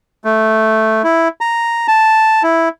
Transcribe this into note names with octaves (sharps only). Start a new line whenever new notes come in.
A3
E4
A#5
A5
E4